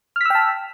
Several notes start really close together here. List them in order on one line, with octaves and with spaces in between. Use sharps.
F6 B6 E6 G5 A5